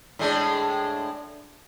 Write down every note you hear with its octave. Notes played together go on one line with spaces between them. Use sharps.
A2 G#3 D4